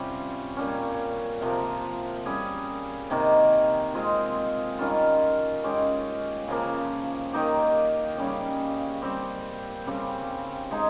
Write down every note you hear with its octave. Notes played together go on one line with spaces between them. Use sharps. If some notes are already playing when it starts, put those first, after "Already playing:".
Already playing: C3 G3 C#4 F4
A#2 G3 C#4
C3 F3 A#3
G3 C#4 G#4
C3 D#3 A#3
G#3 C4 F4 G#4
D#3 G3 C#4 F4
G#3 C#4 G4
C#3 F3 A#3
D#3 A#3 D#4 G4
C#3 G3 C#4 G4
G3 C4 G4
C#3 G3 C4
G#3 D#4 G#4